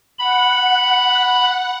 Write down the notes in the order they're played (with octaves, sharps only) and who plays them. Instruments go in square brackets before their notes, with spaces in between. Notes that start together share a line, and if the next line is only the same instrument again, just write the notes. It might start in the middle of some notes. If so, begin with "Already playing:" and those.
[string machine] F#5 [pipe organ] B5